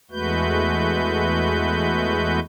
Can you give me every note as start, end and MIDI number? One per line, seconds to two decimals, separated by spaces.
0.11 2.40 40
0.11 2.40 56
0.11 2.40 57
0.11 2.40 66
0.11 2.40 71
0.11 2.40 91